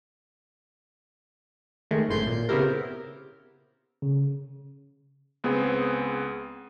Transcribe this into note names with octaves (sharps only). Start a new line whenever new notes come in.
D#3 G#3 A3
G#1 F#2 A2 C6 G6
A#2
C#3 B3 C4 E4 G4 A#4
C#3
C#2 B3 C4 G#4